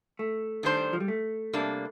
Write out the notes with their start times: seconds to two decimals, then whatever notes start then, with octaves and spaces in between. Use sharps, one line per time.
0.19 A3
0.63 D#3 G3 D4 G4 C5
0.93 F3
1.00 G3
1.08 A3
1.53 C3 G3 A#3 D4